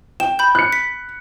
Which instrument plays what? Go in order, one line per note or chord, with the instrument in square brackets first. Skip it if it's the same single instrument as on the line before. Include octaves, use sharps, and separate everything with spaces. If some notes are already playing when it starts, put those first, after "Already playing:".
[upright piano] G5 [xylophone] E7
[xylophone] B5 G6
[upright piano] F#6 C#7
[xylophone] B6